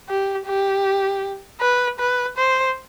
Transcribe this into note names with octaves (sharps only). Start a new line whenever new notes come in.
G4
G4
B4
B4
C5